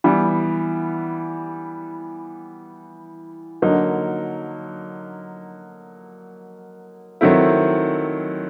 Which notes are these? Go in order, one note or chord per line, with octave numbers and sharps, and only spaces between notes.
E3 G3 B3
D3 F#3 A#3 D#4
D#3 F#3 A3 C4 E4